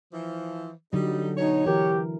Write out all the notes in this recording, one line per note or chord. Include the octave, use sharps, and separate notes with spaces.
E3 F3
D3 F#3 G3 D#4
B2 D#4 C#5
E3 G4 A#4